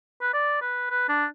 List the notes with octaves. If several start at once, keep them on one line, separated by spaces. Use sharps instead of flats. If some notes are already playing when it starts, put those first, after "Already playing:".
B4
D5
B4
B4
D4